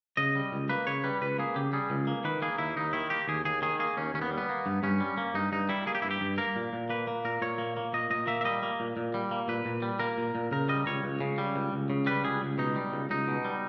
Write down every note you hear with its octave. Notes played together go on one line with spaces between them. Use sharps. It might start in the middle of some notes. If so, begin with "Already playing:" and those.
C#3 D#5
G3
C#2
A#3 B4
C#3 C#5
G3 B4
C#2 B4
A#3 G#4
C#3 G4
G3 G#4
C#2
A#3
D#3 B4
A#3 G#4
D#2 E4
D#2 D#4
D#3 E4
A#3 G4
D#2 G#4
D#2 G#4
D#3 G#4
A#3 G#4
D#2 C#4
D#2 C#4
B3
G3
B3
A#3
G2
G2 C#4
G3
A#3
G2 D#4
G2 D#4
G3 E4
A#3 G#4
G4
G2 E4
G4
G2
A#3 A#4
A#2
A#2
A#3 B4
A#3
A#2 A#4
A#2 C#5
A#3
A#3
A#2 D#5
A#2 D#5
A#3 E5
E5
G3 D#5
A#3
A#2
A#2
G3
A#3
A#2 B4
A#2
G3
A#3 A#4
A#2
A#2
C#3 A#4
G3 D#5
C#2 C#5
C#2
C#3
G3
C#2
C#2
C#3
G3 B4
C#2 G#4
C#2
B2 D#4
G3
C#2
C#2 D#4
B2
G3